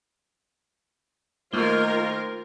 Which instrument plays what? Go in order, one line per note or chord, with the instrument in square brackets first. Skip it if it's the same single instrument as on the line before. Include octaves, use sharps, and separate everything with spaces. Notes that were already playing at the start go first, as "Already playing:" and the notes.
[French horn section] D#3 C5 D#5 [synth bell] A3 A#3 G7 [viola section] F4 A#4